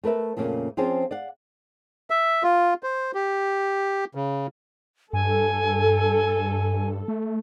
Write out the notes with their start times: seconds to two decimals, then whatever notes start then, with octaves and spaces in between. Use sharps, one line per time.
0.04 A3 A#4 B4 E5
0.37 F2 A#2 C#3 A3 A#3 C#4
0.77 F3 C4 C#4 F4 G#4 C5
1.11 D5 F5 F#5
2.10 E5
2.43 F4
2.83 C5
3.15 G4
4.15 C#3
5.13 G2 A4 G#5
7.08 A3